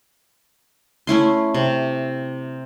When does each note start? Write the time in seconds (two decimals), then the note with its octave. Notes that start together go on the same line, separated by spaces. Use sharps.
1.07 A3 C#4 E4 C6
1.54 C3